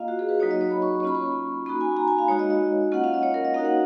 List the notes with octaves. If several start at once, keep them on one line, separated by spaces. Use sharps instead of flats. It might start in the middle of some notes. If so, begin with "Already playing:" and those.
Already playing: A#3 F4 D#5 F5
F#4
G#4
B4
F#3 A#3 D#4 F#4 C#5
D#5
C#5
B5
C#6
C#6
A#3 C#4 F4 B5
C#6
A#3 D#4 F#4 B5
G#5
A#5
G#5
F5
G#3 D#4 F#4 C#5
D#5
D#5
A#3 C#4 F4 F#5
F5
D#5
C#5
A#4
D#5
A#3 D#4 F#4 F5
F#5